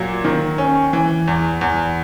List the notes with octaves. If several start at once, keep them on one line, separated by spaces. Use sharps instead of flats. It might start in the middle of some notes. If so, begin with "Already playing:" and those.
Already playing: A#2 F#3
D#3
C#4
E3
E2
E2